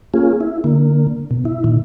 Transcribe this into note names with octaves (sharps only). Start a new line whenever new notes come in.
A#3 C#4 F4 G#4
E4
D3 A#3
B2
E4
A#2 D#3